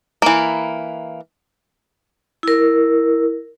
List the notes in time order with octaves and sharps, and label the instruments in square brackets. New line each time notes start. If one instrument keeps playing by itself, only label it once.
[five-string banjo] E3 A#3
[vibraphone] E4 A#4